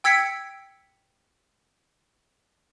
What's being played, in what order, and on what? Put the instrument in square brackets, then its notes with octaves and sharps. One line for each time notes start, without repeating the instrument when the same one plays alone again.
[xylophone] G5 E6 G#6 B6 C#7 D7